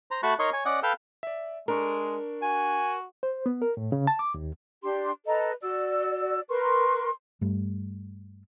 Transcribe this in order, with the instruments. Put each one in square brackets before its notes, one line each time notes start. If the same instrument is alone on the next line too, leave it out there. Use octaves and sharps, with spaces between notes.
[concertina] C5 A#5
A3 F#4 A5 B5 C#6 F#6
D#4 A#4 C#5 D#5 C6 C#6
C#5 G#5
C#4 D5 D#5 F#5
A4 B4 F5 G5 E6
[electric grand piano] D5 E5
[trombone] G#3 [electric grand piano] D4 C#6 [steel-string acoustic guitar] A#4
[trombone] F#4 [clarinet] G#5
[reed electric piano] C5
B3
A#4
A2
C#3
A5
D6
D#2
[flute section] D4 G4 C6
A4 B4 D#5 A#5
F#4 D5 E6
A#4 B4 C6 C#6
[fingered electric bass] G2 G3 A3